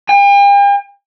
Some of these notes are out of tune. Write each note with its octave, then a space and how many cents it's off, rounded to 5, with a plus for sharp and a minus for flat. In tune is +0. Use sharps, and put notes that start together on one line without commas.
G5 +45